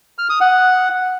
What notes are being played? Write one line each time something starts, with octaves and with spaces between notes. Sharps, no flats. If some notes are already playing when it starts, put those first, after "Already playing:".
F6
D#6
F#5